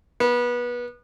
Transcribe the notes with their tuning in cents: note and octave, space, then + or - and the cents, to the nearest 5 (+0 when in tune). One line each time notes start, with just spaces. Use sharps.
B3 -25